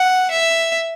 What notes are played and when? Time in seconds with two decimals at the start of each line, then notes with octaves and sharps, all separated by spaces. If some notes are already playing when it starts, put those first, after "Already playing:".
Already playing: F#5
0.31 E5